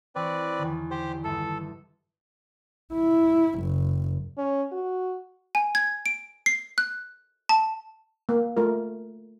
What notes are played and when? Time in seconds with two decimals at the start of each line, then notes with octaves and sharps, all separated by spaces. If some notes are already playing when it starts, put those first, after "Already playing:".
0.16 E3 C4 B4 C#5 D5
0.59 E2 D3 D#3
0.91 G4 C5
1.24 G1 A4 E5 D#6
2.93 E4
3.61 F#1
4.37 C#4
4.72 F#4
5.55 G#5
5.75 G#6
6.06 D7
6.46 C7
6.78 F#6
7.49 A5
8.29 A#3
8.57 A3 F4 A#4